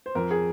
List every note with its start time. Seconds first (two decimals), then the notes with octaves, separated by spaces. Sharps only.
0.06 C5
0.15 F2 A#4
0.31 G#4